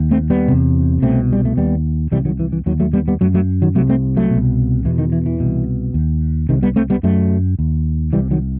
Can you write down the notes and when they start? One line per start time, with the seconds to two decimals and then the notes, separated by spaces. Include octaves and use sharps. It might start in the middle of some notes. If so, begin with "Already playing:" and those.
Already playing: D#2
0.11 A3 C4
0.30 G3 B3
0.48 E2 C3
1.02 C2 B2 A3 C4
1.33 G3
1.45 A3
1.57 D#2 G3 B3
2.12 C2 C3 E3 G3
2.25 D#3 F#3
2.40 E3
2.52 E3
2.66 D#2 D#3 F#3
2.80 F#3 A3
2.93 G3 B3
3.08 G3 B3
3.21 F#2 F#3 A3
3.34 F#3 A3
3.62 D#3 F#3
3.75 C3 F#3 A3
3.79 C2
3.89 A3 C4
4.17 F#3 A3
4.30 C2 B2
4.85 E2 B2 E3
4.99 D#3
5.12 E3
5.26 E3
5.40 C2 B2
5.94 D#2
6.49 C2 C3 D#3
6.63 G3 B3
6.76 A3 C4
6.90 G3 B3
7.03 F#2 F#3 A3
7.59 D#2
8.13 C2 C3 E3 G3
8.31 D#3 F#3